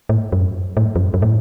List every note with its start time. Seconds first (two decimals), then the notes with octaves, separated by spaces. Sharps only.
0.09 A2
0.32 F#2
0.77 A2
0.96 F2
0.99 F#2
1.14 F#2
1.22 A2